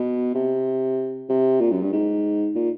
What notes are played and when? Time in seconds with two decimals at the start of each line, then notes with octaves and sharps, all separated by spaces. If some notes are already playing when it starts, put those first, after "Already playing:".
Already playing: B2
0.35 C3
1.29 C3
1.61 A#2
1.72 F#2
1.82 G2
1.92 G#2
2.55 A#2